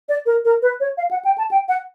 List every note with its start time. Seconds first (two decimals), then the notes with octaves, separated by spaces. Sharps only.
0.09 D5
0.26 A#4
0.45 A#4
0.62 B4
0.80 C#5
0.97 F5
1.11 F#5
1.25 G5
1.38 A5
1.51 G5
1.68 F#5